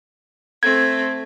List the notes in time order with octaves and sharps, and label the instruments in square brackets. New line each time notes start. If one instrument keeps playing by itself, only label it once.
[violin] A3 C4 [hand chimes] G#6